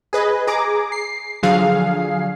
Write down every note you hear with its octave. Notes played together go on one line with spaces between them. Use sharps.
G#4 B4 D#5
G#4 A#5 D6
C7
D3 F3 F#3 G#4 F5 C7